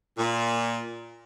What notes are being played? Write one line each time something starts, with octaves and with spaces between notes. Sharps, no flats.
A#2